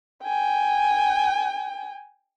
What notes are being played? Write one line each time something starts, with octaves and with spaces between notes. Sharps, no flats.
G5 G#5